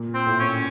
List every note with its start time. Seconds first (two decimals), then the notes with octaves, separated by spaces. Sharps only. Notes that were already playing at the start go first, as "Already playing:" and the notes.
Already playing: A#2
0.14 C4
0.26 A2
0.40 C#4